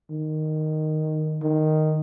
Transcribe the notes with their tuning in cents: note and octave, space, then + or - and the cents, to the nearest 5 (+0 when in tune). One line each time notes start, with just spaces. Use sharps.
D#3 -5
D#3 -5